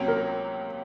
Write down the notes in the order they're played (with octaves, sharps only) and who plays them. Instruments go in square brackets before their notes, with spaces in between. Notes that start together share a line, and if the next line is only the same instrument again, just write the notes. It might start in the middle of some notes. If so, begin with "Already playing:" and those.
Already playing: [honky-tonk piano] C#2 C3 F#3 A#3 C#4
[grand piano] A#4